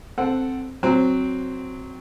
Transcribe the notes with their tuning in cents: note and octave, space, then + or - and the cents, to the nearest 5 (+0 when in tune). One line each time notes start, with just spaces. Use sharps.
C4 +0 A4 +0 F#5 +0
F#3 +0 C4 +0